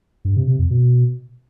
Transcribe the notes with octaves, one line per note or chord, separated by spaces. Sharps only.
G2
C3
C3
F2
B2